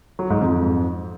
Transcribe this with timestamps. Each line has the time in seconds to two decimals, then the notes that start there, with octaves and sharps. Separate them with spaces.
0.19 F#3
0.30 G#2
0.41 F2